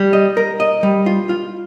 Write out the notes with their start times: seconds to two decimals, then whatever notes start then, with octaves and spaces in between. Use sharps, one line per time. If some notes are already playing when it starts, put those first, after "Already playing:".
Already playing: G3
0.13 D#5
0.37 A#4
0.60 D#5
0.83 G3
1.06 F4
1.29 F4